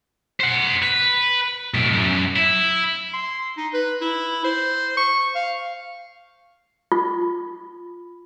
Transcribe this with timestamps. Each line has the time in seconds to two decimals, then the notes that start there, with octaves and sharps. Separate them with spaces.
0.40 C5 F#5
0.82 B4
1.74 B1 A2
1.93 F#2
2.36 E4
3.13 C6
3.57 D#4
3.73 B4
4.01 E4
4.44 C5
4.97 C#6
5.35 F5
6.92 F4